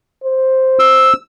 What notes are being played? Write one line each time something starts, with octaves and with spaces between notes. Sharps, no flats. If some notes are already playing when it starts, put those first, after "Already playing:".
C5
E6